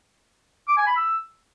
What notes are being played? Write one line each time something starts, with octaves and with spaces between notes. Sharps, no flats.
D6
G#5
B5
E6